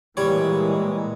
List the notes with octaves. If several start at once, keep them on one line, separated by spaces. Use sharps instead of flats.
A#2 E3 G3 G#3 C#5